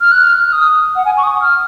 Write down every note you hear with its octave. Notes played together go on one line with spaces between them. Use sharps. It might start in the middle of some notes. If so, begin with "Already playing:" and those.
F6
F#6
F6
F6
D#6
F#5
G#5
C#6
D#6
F6